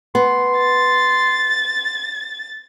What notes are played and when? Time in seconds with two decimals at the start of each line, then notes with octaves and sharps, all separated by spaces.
0.15 B3 C6
0.58 A6